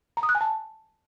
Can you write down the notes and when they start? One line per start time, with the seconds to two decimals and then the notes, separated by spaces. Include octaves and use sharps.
0.17 A#5
0.23 D#6
0.29 F#6
0.35 G#5
0.41 A5